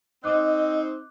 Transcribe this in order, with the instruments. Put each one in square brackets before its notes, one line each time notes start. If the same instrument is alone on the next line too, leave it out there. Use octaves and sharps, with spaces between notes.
[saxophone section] C4 D#4 [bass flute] D#5 [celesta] D6 F#6